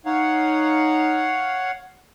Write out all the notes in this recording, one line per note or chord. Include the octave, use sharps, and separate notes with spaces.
D#4 C#5 F5 F#5